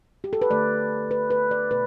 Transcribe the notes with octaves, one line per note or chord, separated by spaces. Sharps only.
G4
A4
B4
D3 A3 D5
B4
B4
D5
B2 A3 B4